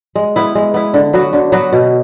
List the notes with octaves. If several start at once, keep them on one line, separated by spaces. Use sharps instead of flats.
G#3
B3 E4
G#3
B3 E4
D3
F#3 B3 F#4
D3
F#3 B3 F#4
B2